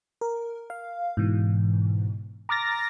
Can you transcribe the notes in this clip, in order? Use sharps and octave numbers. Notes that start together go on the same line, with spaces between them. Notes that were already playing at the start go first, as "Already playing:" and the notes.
A#4
F5
G#2 B2 E3
A#5 D6 F6 A6 A#6